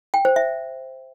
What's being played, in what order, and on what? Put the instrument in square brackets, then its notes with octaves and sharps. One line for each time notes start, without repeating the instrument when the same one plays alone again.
[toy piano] G5
C5
E5